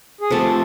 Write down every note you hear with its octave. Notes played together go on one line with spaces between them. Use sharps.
G#4
C3 F3 A3 A4